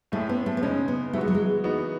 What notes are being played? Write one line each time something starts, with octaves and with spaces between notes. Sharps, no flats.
A2 G#3 A3 C#4
B3
A3
B3
C#3 G#3 C#4 D#4
B3
E3 G#3 A3 B3 F#4
F#3
G#3
E3 B3 D#4 F#4